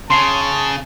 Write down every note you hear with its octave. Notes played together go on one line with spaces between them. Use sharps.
C#3 A5 C6 C7 G7